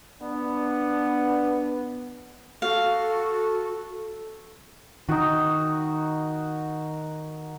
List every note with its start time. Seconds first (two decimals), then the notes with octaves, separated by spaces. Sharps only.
0.21 B3 D4
2.62 F#4 A4 F5
5.09 D#3 D#4 F#4